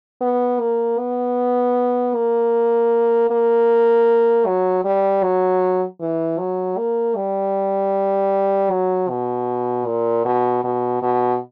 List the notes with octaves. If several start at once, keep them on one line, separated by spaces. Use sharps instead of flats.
B3
A#3
B3
A#3
A#3
F#3
G3
F#3
E3
F#3
A#3
G3
F#3
B2
A#2
B2
B2
B2